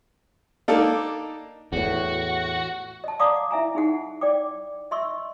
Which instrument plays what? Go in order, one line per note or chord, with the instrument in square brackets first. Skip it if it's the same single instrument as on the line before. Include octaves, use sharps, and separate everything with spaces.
[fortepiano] A#3 D4 D#4 A4
[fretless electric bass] E2 A2 [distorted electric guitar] F#4
[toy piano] D#5 A5
D5 F5 F#5 A#5 D6 D#6
E4 E5 G#5 A#5
D#4 G#4 F#5
D5 G5 D6
D#5 E5 C6 C#6 E6